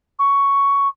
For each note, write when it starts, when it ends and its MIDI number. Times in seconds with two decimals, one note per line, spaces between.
0.19 0.88 85